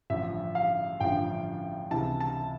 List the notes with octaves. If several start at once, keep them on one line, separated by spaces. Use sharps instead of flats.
A1 G2 D3 F3 E5
F5
A1 G2 D3 F3 G5
C#2 C3 E3 A5
A5